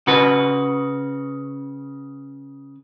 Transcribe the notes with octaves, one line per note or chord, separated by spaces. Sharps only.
C#3 F#4 B4